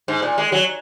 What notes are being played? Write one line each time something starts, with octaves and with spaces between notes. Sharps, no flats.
G#2
A#2
G#3
F#3